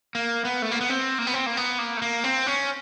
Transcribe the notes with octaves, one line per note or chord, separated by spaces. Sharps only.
A#3
B3
A3
A#3
B3
C4
A#3
B3
C4
A#3
B3
A#3
A3
A#3
C4
C#4